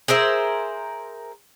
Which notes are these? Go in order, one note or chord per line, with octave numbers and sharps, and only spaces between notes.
G#4 A#4 C5 E5